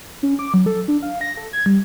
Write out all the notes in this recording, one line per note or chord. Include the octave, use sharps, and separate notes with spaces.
C#4
D6
F#3
A4
D4
F5
A#6
A4
G#6
G3